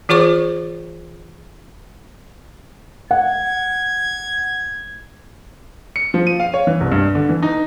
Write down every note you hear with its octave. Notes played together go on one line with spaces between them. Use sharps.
E3 F4 G#4 C5 C#6 D6
F#5 G#6
C#7
F3
D#7
F5
C#5
E3
C2
G2
D3
E3
D#4